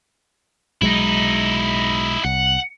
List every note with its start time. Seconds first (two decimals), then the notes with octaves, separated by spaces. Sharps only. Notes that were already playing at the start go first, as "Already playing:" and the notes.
0.82 B1 F#3 G#3 D#4 E4
2.24 C2 F#5